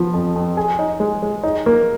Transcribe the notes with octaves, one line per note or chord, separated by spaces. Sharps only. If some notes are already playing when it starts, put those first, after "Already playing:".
Already playing: F3 B3
F2
F2
G#4
D#4
G#3
G#3
D#4
A#3